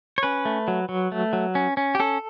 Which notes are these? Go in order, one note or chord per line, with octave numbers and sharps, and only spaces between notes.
C#5
C#4 B4
A3
F#3
F#3
A3
F#3
C#4
C#4
G4
C#4 A4